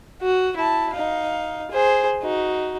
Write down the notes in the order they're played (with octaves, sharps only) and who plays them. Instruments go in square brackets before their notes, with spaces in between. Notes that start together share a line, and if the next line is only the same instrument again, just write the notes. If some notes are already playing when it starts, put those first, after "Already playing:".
[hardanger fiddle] F#4
E4 A5
D#4 F5
G#4 C5
D#4 F#4